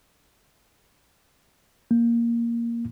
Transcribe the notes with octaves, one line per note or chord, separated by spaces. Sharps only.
A#3